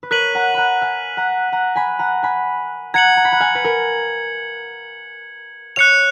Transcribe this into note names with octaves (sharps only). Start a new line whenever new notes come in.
B4
A#4 C#5 F#6 B6 D#7 F#7
F#5 A#5
F#5 A#5 B5
F5 G#5
F#5 A#5
F#5 A#5
G#5 B5
F#5 A#5
G#5 B5
F#5 A#5 G#6 C#7 F#7
A#5
B5
F#5 A#5
F5 G#5
B4
A#4
C#5 F5 F#6 C#7 F7